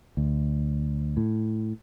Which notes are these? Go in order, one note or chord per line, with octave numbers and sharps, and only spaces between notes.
D2
A2